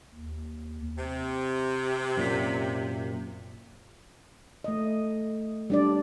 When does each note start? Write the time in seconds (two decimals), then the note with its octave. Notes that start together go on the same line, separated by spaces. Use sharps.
0.15 D#2
0.97 C3
2.17 F#2 A#2 B6
4.64 A3 D#5
5.70 G3 D4 D5